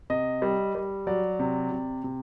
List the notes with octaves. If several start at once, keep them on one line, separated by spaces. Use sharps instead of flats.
C3 D#5
G3
G3
F#3 D5
C3
C3
C3